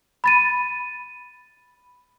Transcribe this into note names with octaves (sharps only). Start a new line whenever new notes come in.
B5 A6 D#7